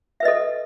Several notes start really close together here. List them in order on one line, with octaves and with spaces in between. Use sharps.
E5 B4 D#5 A4